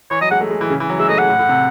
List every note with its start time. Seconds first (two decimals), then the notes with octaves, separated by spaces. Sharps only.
0.11 E3 C#5
0.21 F#3 D#5
0.31 G#3 F#5
0.41 A3
0.51 G#3
0.61 E3
0.70 C#3
0.80 E3
0.90 F#3
1.00 G#3 E5
1.09 A3 D#5
1.19 G#3 F#5
1.29 A2
1.39 A2
1.49 C3